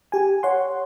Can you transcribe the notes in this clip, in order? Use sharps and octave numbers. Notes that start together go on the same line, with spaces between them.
G4 G#5
C#5 F#5 C6